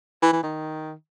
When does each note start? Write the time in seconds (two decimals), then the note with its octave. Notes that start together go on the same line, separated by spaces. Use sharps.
0.22 E3
0.33 E3
0.43 D#3